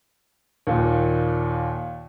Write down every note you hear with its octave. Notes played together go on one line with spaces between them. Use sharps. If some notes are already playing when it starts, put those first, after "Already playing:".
D#2 A#2